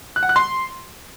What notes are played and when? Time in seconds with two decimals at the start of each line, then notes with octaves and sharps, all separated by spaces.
0.16 F#6
0.23 F#5
0.29 F#6
0.36 C6